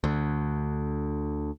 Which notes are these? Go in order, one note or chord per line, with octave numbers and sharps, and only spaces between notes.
D2 D3